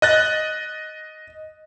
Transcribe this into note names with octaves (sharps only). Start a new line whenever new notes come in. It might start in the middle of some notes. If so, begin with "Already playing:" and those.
D#5 F#6 A6